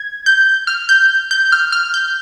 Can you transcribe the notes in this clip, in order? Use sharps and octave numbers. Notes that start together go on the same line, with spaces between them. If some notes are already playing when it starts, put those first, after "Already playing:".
Already playing: G#6
G6
F6
G6
G6
F6
F6
G6